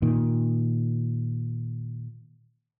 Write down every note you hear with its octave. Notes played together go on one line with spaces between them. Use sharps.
A#2 D#3